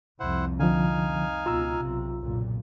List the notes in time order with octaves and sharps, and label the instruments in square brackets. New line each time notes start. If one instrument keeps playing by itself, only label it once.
[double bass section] C2 F2 [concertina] E4 C5 F#5
[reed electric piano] D3 F3 [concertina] D#4 F5 G#5
[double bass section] C#2 B2 [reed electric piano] F4 A#5 E6
[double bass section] B1 C3
F#1 B1 A#2